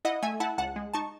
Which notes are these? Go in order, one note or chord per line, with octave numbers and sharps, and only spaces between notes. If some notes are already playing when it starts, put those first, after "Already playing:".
E4 D#5 F#5
A3 E5 G#5
E4 F#5 A5
C#2 F#5 A5
G#3
D#4 A5 C#6